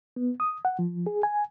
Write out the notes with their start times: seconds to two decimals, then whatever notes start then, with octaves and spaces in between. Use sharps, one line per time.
0.16 B3
0.40 D#6
0.65 F#5
0.79 F3
1.07 G#4
1.23 G#5